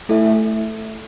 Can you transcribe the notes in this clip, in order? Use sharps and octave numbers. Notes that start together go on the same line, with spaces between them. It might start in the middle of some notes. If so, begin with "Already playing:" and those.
A3 E4 A4 E5